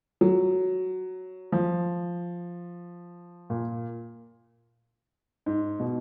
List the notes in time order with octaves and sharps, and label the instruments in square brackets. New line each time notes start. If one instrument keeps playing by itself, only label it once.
[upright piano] F#3
F3
A#2
G#2
B2